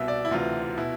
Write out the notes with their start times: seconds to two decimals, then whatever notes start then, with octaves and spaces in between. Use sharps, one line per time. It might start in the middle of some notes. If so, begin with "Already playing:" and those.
Already playing: C2 B2 E5
0.08 D5
0.25 E4
0.31 D2 C3 E3 F4
0.78 B2 E4